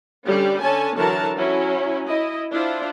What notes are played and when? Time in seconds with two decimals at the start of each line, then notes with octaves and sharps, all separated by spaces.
0.26 D3 G3 C#4 G4 D5
0.61 D3 C#4 C#5 G#5 A5
0.96 D3 E3 F#3 F#4 A#4 A5
1.36 F#3 C#4 E4
2.07 E4 D#5
2.51 D4 E4 F4 C5